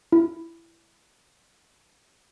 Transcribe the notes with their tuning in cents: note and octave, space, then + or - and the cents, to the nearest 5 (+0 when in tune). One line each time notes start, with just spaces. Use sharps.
E4 +20